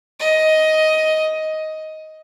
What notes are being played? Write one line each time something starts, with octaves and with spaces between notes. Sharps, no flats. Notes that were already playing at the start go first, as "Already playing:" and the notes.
D#5